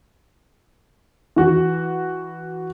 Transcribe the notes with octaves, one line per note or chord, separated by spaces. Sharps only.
E3 F#4